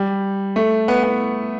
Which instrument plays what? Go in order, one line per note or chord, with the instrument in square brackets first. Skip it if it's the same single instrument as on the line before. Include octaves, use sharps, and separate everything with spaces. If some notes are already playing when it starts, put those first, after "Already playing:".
Already playing: [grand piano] G3
A3
B3
B3